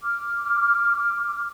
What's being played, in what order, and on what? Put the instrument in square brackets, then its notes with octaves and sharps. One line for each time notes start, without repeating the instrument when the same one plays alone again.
[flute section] D6 F6